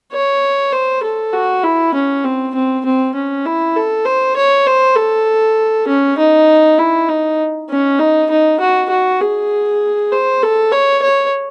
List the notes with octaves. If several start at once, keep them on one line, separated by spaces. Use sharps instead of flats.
C#5
C5
A4
F#4
E4
C#4
C4
C4
C4
C#4
E4
A4
C5
C#5
C5
A4
C#4
D#4
E4
D#4
C#4
D#4
D#4
F#4
F#4
G#4
C5
A4
C#5
C#5